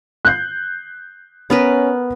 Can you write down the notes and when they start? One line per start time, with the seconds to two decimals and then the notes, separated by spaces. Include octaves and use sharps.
0.25 F#6 G6 C7
1.50 B3 C#4 A#4 B4